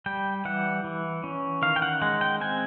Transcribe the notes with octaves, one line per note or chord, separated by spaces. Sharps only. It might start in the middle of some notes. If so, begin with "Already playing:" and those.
G3 G5
E3 F#5
E3
C#4
D#3 F5
G5
F#5
G#3 F#5
G5
C4 G#5